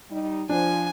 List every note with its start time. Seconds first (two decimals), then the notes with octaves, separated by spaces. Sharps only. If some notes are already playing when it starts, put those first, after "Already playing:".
0.11 G3 D#4
0.49 F3 D4 G#5